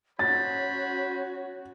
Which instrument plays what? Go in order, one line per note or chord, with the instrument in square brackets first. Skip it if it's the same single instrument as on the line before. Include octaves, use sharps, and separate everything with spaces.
[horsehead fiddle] C#4 F#4 [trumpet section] C5 B5 [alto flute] C#5 [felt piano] A6